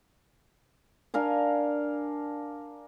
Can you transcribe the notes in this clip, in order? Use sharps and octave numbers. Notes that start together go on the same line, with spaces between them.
D4 A#4 F5 G#5